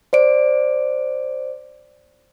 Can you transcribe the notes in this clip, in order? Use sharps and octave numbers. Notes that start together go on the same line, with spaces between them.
C5 D5 D7